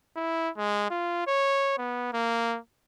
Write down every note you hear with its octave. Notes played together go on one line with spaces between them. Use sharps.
E4
G#3
F4
C#5
B3
A#3